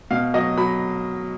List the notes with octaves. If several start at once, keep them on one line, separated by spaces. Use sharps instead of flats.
B2 F5
F#3 D#5
F#3 B5